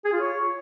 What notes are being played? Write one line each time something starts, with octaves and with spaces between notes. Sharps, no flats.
G#4
F4
C#5